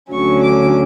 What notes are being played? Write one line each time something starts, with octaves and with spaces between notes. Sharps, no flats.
D2 D3 F#3 C#4 C#6
D6